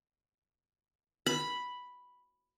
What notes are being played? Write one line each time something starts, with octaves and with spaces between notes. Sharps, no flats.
B5